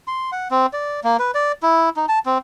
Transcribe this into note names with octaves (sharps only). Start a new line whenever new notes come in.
C6
F#5
C4
D5
A#3
B4
D5
E4
D#4
A5
C4